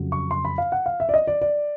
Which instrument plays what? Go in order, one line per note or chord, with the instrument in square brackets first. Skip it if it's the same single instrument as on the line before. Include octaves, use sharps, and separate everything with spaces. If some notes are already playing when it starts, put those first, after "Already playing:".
Already playing: [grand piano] F2 C#3 F#3
C#6
C6
B5
F5
F#5
F5
E5
D5
D#5
D5
D5